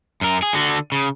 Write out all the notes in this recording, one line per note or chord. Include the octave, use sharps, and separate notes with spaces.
F#2 A#4
G#4
D3 F#4
C#3